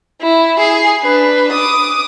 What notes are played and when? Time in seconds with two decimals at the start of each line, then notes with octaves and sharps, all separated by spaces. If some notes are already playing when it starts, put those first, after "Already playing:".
0.22 E4
0.58 G#4 C7
1.02 D4 B4
1.51 D6 D#6